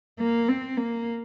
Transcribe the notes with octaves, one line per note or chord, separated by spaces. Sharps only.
A#3
C4
A#3